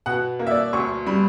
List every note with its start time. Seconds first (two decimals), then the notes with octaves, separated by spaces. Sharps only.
0.06 B2 F#5
0.39 A#3
0.47 E5
0.51 D5
0.73 D2 C#6
1.06 G3 B5